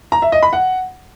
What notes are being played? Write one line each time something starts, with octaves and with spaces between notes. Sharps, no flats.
A#5
E5
D#5
B5
F#5